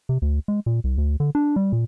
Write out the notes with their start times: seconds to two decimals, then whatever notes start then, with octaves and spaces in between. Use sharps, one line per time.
0.09 C3
0.22 D2
0.48 G#3
0.66 A#2
0.84 C2
0.98 D2
1.20 D3
1.35 D4
1.56 G3
1.72 A#2